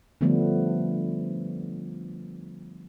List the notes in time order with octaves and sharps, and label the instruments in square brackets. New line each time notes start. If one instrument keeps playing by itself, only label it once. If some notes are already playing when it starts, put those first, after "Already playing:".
[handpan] D3 F3 G3 A3 B3 D4